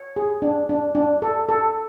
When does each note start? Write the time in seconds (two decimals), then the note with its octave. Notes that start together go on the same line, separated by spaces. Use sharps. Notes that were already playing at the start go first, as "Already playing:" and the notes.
Already playing: C#5
0.16 G#4
0.42 D4
0.69 D4
0.95 D4
1.22 A4
1.49 A4